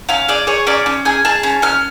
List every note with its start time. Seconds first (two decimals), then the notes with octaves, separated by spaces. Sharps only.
0.09 C#4 F5
0.28 G#4 D5
0.47 G#4 C#5
0.67 C#4 D5
0.86 C#4
1.05 G#4 G#5
1.25 G#4 A5
1.43 C#4
1.62 C#4 F6